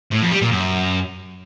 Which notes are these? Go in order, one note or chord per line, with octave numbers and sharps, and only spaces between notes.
A2
F2
G3
A#2
F#2